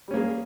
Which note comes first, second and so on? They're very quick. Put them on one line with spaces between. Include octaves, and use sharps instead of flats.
G3 C#4 A#3 G#4